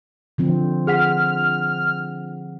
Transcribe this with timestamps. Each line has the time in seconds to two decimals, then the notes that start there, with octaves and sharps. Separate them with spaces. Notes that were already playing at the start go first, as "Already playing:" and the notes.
0.38 D3 F3 C4
0.87 G#4 F#5 F6 B6